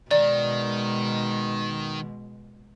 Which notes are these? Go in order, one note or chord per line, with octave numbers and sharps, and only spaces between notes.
B2 D#3 G#3 D5